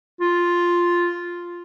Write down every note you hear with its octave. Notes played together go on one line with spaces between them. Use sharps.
F4